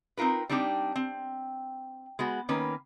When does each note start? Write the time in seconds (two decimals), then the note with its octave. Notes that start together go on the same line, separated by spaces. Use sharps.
0.17 C4 D#4 F4 A#4 B4
0.49 G3 C4 D4 D#4 G4
0.96 C4
2.19 G#3 B3 F#4
2.49 D#3 A#3 C#4 B4